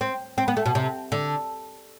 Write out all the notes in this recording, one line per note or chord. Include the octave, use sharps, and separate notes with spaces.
C4
C4
B3
A3
B2
C3
D3